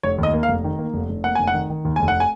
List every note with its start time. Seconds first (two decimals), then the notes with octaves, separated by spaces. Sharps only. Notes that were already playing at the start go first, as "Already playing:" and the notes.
0.03 F1 C#5
0.18 D#2
0.23 D#5
0.34 A#3
0.43 F5
0.49 F1
0.64 D#3
0.79 A#3
0.94 F1
1.09 F1
1.24 A#3 F#5
1.35 F1 G#5
1.47 F#5
1.54 D#3
1.70 D#3
1.85 D#2
1.96 F1 G#5
2.08 F#5
2.20 G#5